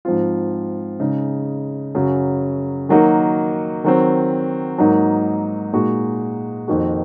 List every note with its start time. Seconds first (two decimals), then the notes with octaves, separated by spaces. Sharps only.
0.05 G#2 F3 C4 F4
1.00 C#3 G#3 D#4
1.95 F#2 C#3 F#3
2.89 D#3 F#3 A#3 D#4 F#4
3.84 D#3 F#3 C4
4.78 G#2 F#3 A#3 D#4
5.73 A#2 G#3 D#4 F#4
6.68 F2 D#3 A#3 D#4 F#4